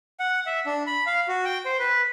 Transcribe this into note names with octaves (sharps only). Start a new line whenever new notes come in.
F#5
E5
D4
B5
F5
F#4
G5
C5
B4